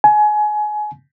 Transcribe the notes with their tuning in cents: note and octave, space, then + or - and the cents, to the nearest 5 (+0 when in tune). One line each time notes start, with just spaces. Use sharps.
G#5 +25